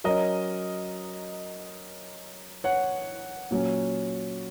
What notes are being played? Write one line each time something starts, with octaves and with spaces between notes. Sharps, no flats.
F#3 C#4 A#4 D#5
C#5 F#5
A#2 F#3 C#4